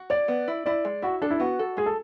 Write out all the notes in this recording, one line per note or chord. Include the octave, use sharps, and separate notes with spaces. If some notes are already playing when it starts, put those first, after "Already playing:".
Already playing: F#4
C#5 D5
B3
E4
E4 D5
G#3
E4 F#4
D4 A4
E4
B3 F#4
A4
G#3 G#4
A4